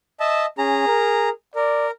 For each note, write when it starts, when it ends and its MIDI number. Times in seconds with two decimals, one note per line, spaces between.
0.20 0.46 75
0.20 0.46 76
0.20 0.46 81
0.58 0.85 61
0.58 1.29 68
0.58 1.29 82
0.87 1.31 70
1.55 1.91 70
1.55 1.88 74